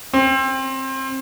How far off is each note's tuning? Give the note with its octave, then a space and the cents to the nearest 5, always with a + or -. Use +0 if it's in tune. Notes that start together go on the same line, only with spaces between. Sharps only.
C4 +25